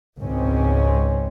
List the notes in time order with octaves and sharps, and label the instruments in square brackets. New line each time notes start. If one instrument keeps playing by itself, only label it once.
[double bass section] G#1 C#2 B2 C4 C#4